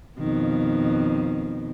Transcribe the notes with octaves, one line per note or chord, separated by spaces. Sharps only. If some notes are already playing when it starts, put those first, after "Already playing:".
F2 B2 D#3